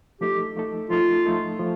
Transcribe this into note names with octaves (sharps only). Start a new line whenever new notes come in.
F3 A3 D#4 G4 A4
F3 A3 D#4 A4
F3 A3 D#4 F4 A4
F3 A3 D#4 A4
F3 A3